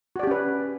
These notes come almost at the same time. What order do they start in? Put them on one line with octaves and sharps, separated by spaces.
F#4 D5 G4 C#4 B4